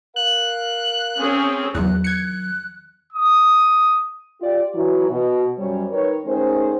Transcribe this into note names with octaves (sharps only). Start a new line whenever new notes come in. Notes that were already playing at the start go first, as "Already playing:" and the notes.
A#4 F5 F#6
C4 C#4 G#4
E2 D#3 F#3 F#6
F#6 G#6 C#7
D#6
F4 G4 D5
E3 F#3 E4
B2
F#2 G3 C5 C#5
D#3 A#4 B4 C#5
D#3 A3 C#4 G#4 C5